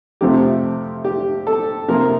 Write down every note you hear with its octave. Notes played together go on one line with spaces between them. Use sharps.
F2 C3 F3 A3 C4 G4
G4
A4
C3 F3 A#3 A#4